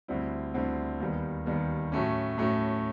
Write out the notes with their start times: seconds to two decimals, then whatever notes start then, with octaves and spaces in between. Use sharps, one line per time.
0.08 D2 D3 G3 C4 E4
0.54 D2 D3 G3 C4 E4
1.00 D#2 D#3 G3 B3
1.46 D#2 D#3 G3 B3
1.92 A2 F#3 A3 C#4
2.38 A2 F#3 A3 C#4